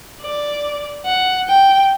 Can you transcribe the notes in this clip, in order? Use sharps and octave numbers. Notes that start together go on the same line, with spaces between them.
D5
F#5
G5